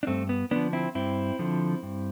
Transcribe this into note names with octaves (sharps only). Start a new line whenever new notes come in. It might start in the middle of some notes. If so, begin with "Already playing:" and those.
D4
G2 A3 C4
B3
D3 F3 B3 D4
C4 E4
G2 C4 E4
D3 F3
G2